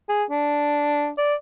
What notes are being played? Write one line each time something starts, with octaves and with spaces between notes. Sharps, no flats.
G#4
D4
D5